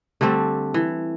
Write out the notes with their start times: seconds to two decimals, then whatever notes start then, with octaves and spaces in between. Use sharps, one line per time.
0.21 D3 G3 A3 C4
0.74 E3